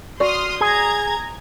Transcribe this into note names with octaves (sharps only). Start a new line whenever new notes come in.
F#4 D5 C6 D#6 F6
G#4 A#5 G#6